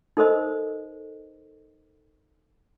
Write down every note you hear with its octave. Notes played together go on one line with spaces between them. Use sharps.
D#4 A4 A#4 C5 D#5